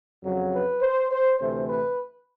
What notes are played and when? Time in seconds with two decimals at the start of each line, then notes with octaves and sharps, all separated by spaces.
0.23 F2 C#3 F#3
0.52 B4
0.81 C5
1.11 C5
1.39 D2 C3 E3 A3 C5
1.68 B4